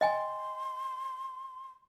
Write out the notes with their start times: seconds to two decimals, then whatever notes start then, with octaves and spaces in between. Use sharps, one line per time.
0.01 D#5 G5 G#5 C6